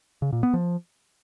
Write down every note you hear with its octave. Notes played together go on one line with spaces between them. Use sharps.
C#3
A#2
B3
F3